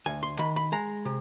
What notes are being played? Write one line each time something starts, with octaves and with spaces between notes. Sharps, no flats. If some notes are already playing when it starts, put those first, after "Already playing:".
D2 G#5
C6
D#3 B5
B5
G#3 A#5
C3